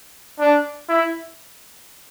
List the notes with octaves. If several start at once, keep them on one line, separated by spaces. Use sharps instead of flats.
D4
E4